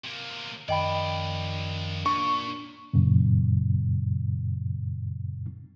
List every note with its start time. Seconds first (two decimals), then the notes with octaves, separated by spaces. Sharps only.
0.04 C3 A#3
0.69 F#2 D#3 F3 D5 D#5 G5 B5
2.06 A#2 D4 C#6
2.93 F#2 A#2 C#3